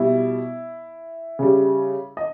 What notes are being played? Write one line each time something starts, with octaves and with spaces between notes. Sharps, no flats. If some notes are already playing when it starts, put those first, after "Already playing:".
Already playing: B2 G3 E4
C#3 G3
D#5